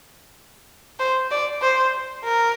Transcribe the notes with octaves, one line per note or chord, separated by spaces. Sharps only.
C5
D5
C5
A#4